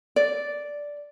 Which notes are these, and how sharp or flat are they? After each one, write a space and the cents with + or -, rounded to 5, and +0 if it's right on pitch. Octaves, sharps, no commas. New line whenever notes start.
D5 -5